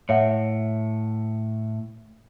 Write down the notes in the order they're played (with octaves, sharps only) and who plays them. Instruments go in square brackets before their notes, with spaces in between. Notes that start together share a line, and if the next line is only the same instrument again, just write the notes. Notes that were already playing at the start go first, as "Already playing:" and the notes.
[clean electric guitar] A2 [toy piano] C#5 E5 F#5